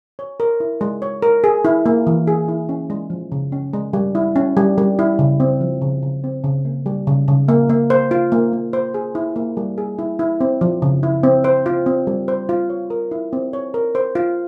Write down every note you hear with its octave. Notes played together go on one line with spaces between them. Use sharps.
C#5
A#4
E4
G#3
C#5
A#4
G#4
E4
A#3
E3
G#4
E4
C#4
G#3
F3
C#3
C#4
G#3
G3
E4
C#4
G3
G3
E4
C#3
C4
F3
C#3
C#3
C4
C#3
A#3
G3
C#3
C#3
A#3
A#3
C5
F4
A#3
A#3
C5
G#4
E4
A#3
G3
G#4
E4
E4
C4
F3
C#3
E4
C4
C5
F4
C4
G3
C5
F4
C#5
A#4
E4
C4
C#5
A#4
C5
F4